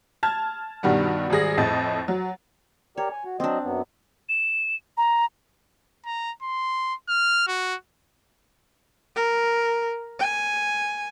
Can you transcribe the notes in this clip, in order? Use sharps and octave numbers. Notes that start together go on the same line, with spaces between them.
A5 F6 G#6
G2 B2 D#3 G3 B3
G#1 G3 G#4 A#6
F2 A2 D#5 A6
F#3
G4 A#4 C#5 D5
G#5
F#4
F#3 C4 D4 D#5
F#2 F#3 B3
E7
A#5
A#5
C6
F6
F#4
A#4
G#5